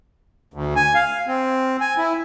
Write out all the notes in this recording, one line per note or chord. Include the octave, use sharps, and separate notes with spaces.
D2
G#5
F5
C4
G#5
E4